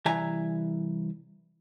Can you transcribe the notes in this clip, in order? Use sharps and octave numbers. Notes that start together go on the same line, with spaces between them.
C2 E3 E5 G#5 A#5